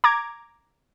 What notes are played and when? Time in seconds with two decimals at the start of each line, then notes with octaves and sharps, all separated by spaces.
0.04 A#5 D6 G#6